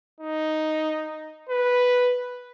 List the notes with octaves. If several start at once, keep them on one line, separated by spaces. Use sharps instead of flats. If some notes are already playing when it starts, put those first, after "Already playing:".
D#4
B4